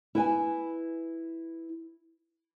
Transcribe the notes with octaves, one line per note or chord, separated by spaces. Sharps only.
E4 B4 G5 G#5